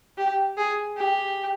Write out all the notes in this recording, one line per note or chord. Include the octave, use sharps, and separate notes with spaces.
G4
G#4
G4